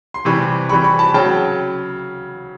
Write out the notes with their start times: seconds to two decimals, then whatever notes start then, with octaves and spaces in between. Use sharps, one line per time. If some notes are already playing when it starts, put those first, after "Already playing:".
0.14 C6
0.25 C3 E3 G3 B5 C#6
0.69 E3 G3 C4 B5 C#6
0.84 B5 C#6
0.99 A5 B5
1.14 C#3 F#3 G5 A5